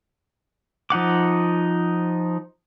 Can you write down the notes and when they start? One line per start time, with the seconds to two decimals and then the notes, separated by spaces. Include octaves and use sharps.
0.90 F3 D#4 F#5 D6